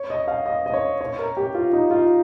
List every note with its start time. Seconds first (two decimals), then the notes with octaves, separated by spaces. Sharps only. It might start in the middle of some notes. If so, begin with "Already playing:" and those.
Already playing: C#5
0.10 D#5
0.27 F5
0.46 D#5
0.66 D#5
0.73 C#5
1.01 C#5
1.19 A#4
1.37 G4
1.55 F4
1.73 D#4
1.91 F4